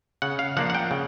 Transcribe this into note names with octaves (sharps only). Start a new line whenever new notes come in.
C#3 F#5
F5
F3 A#3 D4 F#5
F#5
G5
C#3